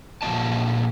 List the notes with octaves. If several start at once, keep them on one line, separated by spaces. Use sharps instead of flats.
A#2 F3 F#3 A3 D#5 A5